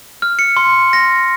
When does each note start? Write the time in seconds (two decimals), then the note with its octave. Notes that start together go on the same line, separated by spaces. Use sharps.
0.22 F6
0.39 C#7
0.57 C6
0.93 A#6